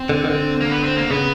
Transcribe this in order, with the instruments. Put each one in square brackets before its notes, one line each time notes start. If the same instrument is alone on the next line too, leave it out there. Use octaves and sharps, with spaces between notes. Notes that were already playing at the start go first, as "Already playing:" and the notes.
Already playing: [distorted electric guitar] C4
[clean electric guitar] D3
D#3
D3
[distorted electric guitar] A#3
B3
C4
A#3
[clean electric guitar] C#3 [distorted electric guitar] B3